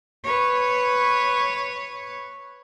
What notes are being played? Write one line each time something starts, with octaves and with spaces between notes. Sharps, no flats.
B4 C#5